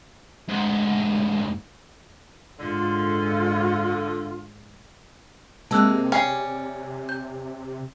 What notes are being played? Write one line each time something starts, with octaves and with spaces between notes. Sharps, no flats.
D2 G#2
G#2 D3 F4
C3 G#3 A#3 C4 A5 E6 F#6
C#4 D5 G5 C7
G6